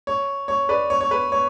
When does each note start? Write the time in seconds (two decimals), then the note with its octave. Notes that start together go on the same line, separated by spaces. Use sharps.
0.07 C#5
0.48 C#5
0.69 B4 D5
0.90 C#5
1.01 C#5
1.11 B4
1.32 C#5